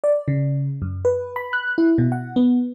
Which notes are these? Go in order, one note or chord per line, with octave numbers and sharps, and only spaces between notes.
D5
C#3
F#2
B4
B5
F#6
E4
B2
F#5
B3